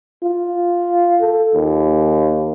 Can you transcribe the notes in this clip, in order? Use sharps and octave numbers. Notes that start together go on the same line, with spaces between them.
F4
A4
D#2